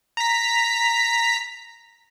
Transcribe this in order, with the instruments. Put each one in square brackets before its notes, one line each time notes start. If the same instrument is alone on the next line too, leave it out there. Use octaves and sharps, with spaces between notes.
[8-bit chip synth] A#5 B6